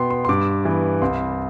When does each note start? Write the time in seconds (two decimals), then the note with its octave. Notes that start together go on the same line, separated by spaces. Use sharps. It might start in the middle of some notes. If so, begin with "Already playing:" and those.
Already playing: B2 B3 G5 C6
0.10 C6
0.25 C6
0.29 G2 D6
0.65 E3 B3
1.02 C2 C6